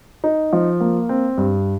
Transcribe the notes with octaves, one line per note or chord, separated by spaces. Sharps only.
D#4
F3
A#3
C4
G2